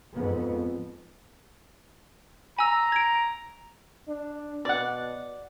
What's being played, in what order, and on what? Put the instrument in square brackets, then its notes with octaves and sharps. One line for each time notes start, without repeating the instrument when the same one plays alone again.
[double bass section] F2 G#2 B3
[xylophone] G#5 E6 [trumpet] A#5
[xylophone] G#6 D7
[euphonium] D4
[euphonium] B2 [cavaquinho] D5 F#5